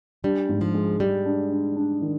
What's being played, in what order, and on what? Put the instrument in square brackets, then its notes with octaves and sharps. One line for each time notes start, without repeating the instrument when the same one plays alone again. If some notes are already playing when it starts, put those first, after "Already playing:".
[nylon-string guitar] G3 [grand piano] D4
[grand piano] G#2
[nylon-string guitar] F3
[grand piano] G#3
[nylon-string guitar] G3 [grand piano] G#3
[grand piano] D4
D4
D4
D#3